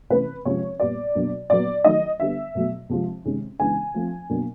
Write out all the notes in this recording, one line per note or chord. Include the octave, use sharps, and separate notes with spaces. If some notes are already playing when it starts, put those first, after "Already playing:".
C3 E3 A3 C#4 B4
C3 F3 G#3 C#4 C#5
A#2 G3 B3 D5
B2 F#3 A#3 D4
A#2 F#3 B3 D5
D#3 F#3 A3 D#5
D3 G3 B3 E5
B2 F#3 A3
C3 F3 G#3
C3 D#3 G#3 C#4
C#3 E3 G#3 B3 D4 G#5
F3 A3 C4
B2 F#3 A#3 D4